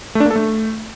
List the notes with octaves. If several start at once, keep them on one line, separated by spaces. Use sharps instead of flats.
A3
D4
A#3
A4
A3